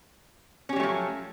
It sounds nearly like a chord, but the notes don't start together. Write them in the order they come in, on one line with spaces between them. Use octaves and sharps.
C#4 G4 F#3 A3 F3